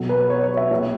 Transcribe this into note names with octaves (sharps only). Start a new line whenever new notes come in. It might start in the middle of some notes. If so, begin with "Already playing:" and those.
Already playing: B1 B2
B4
C#5
C#5
E5
A#1 A#2